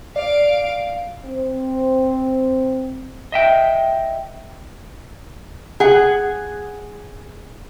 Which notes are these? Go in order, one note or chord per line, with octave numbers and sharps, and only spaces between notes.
D5 F5 D7
C4 C5
D#5 E5 G5
G#4 F#5